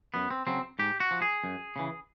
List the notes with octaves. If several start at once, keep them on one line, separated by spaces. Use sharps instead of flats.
F#2 B3
C4
C#3 F#3 C4
G#2 G4
F#4
F3
G#4
F#2
C#3 E3